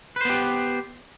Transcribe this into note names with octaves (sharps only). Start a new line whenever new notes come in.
B3 G4 B4 C5